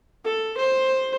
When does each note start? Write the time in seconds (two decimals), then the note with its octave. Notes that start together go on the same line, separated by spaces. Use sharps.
0.24 A4
0.58 C5